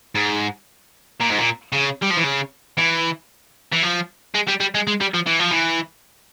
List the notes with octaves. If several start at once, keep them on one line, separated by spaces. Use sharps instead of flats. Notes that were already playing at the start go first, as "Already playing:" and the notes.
G#2
A#2
G#2
A#2
C#3
G3
F3
E3
C#3
E3
E3
F3
G#3
G3
G3
G#3
G#3
G3
F3
E3
F3
E3